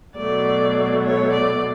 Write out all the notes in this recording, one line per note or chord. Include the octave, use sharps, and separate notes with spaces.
B2 F#3 A3 D5
C#5
D5